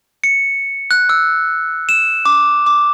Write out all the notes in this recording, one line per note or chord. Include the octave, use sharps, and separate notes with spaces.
C#7
F#6
E6
E7
D6
D6